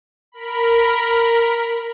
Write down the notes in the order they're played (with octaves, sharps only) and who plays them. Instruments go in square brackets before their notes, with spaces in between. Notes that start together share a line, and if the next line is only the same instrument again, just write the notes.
[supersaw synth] A#4 B5